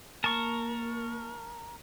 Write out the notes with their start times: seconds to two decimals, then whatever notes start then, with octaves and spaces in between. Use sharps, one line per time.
0.24 A#3 A#4 A5 C#6